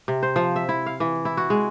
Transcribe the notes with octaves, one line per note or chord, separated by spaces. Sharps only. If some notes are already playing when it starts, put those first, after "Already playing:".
C3
C5
F3
E5
E4
F5
E3
E4
F#4
G#3